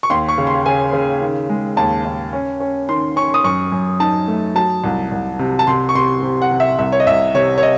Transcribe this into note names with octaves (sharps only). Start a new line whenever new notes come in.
C#6
D#2 C6
C#6
C#3
C6
C#3 G#5
C#3
D#3
G#3
D#2 A5
D#2
C#4
C#4
D#3 C6
C#4 C#6
D#6
F#2 C#6
F#2
D#4 A5
A3
F#3 A5
C2
C2
C3
A5
C3 C6
C#6
C3 C6
C3
F#5
C3
E5
C2 E5
C#5
D#5
C2 E5
C3 C#5
C#5
D#5